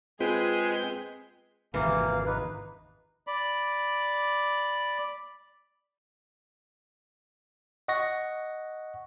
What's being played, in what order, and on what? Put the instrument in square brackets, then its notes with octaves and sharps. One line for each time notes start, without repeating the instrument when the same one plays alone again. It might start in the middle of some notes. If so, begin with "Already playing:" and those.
[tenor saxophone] G#3 [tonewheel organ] C4 B4 G6 [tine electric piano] F4 [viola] G#4
[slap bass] G#1 F2 C3 [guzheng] E3 [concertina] A#3 F5
[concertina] D#4 B4
D5 B5
[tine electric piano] D#5 F#5 C#6 A#6